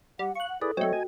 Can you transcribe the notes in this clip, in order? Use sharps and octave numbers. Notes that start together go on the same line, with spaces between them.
G3 F#5
F5 C#6 F#6
F#5
E4 G#4 A4 B4 D5 D#6
F#3 A3 C4 C#5 D#5 G5
F#4 G#5